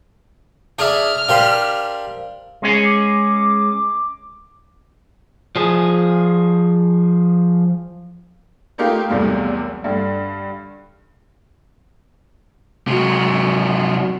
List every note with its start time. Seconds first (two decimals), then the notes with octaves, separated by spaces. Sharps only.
0.79 D4 G#4 E5 F6
1.29 D4 G4 A#4 C5 F5 C6
2.62 G#3 C#4 G#4
2.85 D6
5.56 F3 G#4
8.78 A3 A#3 D#4 F4 G4 A#4
9.08 B1 E2 C3 G3 A3 A#3
9.84 G2 D3
12.88 C3 F#3